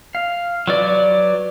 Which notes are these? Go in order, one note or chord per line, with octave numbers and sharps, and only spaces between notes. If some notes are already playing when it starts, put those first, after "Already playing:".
F5
F#3 B4 D5